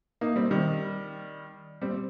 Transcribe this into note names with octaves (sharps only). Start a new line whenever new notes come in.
A#3 D#4
G3 C4
D#3 G3
G3 C4